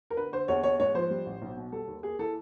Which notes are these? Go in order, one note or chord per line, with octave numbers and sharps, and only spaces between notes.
A#4
D3 B4
D3 C5
E2 C#5
E2 C#5
G#2 C#5
F3 C5
G3
A1
B1
B2
G3 A4
D#2
A#3 G#4
E3 A4